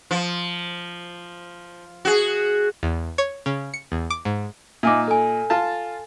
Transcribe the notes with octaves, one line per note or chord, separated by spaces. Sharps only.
F3
F#4 G#4
E2
C#5
C#3
C#7
E2
D6
G#2
A#2 D#4 E5 G#5 D6
A4 G#5
F4 A5